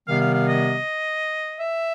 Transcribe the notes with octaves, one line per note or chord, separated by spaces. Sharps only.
C3 D#3 G3 B3 F5
F5
F5
D#5
E5